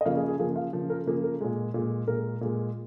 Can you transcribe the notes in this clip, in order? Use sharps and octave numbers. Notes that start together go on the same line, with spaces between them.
D#5
C#3 F3 A#3 F5
G#4
G#4
C#3 F3 A#3 G#4
F5
C#3 F3 A#3
A#4
C#3 F3 A#3 G#4
A#4
A#2 G#3
A#2 G#3
A#2 G#3 A#4
A#2 G#3